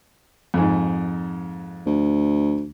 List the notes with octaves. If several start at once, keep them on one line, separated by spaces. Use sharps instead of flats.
F2 G#2
D2